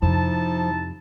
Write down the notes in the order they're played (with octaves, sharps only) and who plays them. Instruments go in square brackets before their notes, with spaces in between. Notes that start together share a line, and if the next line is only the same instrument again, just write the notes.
[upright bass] F2 C3 [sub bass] F3 [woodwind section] D#4 E4 A5